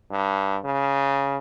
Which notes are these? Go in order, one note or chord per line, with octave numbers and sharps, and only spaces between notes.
G2
C#3